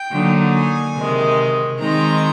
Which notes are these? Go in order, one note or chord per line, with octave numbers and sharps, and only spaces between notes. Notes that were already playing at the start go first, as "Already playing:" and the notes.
Already playing: G5
D3 F#3 A#3 D#4
G#5
C3 D#3 G#3
D#3 G#3 C4 D#4 A#5